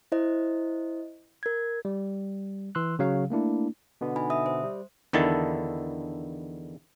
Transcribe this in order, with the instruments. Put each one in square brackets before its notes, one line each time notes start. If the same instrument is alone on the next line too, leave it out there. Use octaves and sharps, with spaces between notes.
[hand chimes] E4 C5 D#5
A#4 G#6
[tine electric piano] G3
E3 C6 E6 F#6
C#3 F#3 F5
A3 A#3 D4 E4
B2 D3 B3
[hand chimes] D#4 G#5 B5
E5 D#6
C5
[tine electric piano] G3
[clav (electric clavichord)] E2 D3 D#3 E4 A4 A5